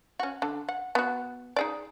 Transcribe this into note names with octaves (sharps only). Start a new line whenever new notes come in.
C#4 F#4
D3
F#5
B3 F#4
D#4 G#4 D5